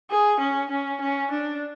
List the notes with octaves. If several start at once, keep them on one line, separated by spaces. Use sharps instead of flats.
G#4
C#4
C#4
C#4
D4